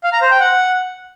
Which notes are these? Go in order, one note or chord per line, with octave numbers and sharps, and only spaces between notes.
F5
A#5
C5
G5
F#5